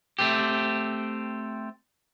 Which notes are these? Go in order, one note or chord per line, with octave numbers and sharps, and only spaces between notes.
A3 C4 G4